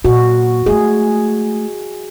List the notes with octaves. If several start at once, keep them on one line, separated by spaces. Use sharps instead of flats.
A#2 F#4
G#3 A3 G#4